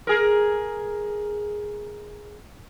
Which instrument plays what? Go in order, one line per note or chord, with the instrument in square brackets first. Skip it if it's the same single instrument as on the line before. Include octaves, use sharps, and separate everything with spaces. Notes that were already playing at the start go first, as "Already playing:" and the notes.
[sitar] G#4 A#4